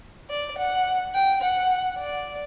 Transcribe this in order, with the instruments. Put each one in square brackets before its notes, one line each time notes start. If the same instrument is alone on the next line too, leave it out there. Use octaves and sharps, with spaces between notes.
[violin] D5
F#5
G5
F#5
D5